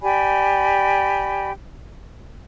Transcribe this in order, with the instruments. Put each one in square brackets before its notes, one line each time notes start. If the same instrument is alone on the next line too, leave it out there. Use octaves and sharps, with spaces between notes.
[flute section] G4 D5 G#5 B5